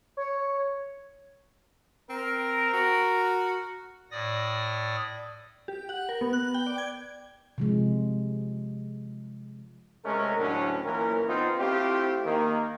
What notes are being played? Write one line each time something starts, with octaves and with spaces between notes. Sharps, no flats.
C#5
C4 A#4
F#4
A2 D5 D#6 A#6
G4
F#5
A#4
B3
F#6
G5
D5
G#6
C3 F3 G#3
C3 G#3 A3 C#4 A#4
A1 D2 A2 F#3 C#4 D4
B1 A#2 E3 C#4 A#4
D3 B3 C4 D#4 F4
A3 C4 E4 F4 G4
D#3 A#3